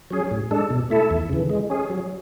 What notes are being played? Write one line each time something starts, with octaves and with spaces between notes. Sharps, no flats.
F#3 C#4 G#4
A2
G#3 D4 A4
B2
A3 E4 A4
E2
C#3 E3
G#3
C#4 G#4
F#3